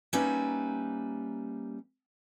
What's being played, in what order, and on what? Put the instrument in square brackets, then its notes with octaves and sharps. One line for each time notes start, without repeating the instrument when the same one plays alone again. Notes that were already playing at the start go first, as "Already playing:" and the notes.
[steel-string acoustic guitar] G3 A#3 C#4 D#4 B4 E5